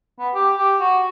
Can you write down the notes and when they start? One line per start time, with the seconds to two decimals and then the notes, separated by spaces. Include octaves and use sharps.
0.19 B3
0.34 G4
0.58 G4
0.80 F#4